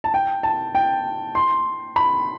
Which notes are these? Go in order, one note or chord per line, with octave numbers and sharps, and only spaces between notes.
A5
G5
A5
G5
C6
B5